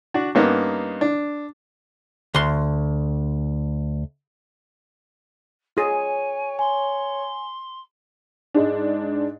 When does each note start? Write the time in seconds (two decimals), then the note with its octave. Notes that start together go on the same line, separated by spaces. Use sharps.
0.14 D4 F#4
0.35 G2 A#3 B3 C#4 D#4
1.01 D4
2.34 D2 C6
5.77 F4 G#4 C#5 G#5
6.59 G#5 C6
8.54 G#2 G#3 D4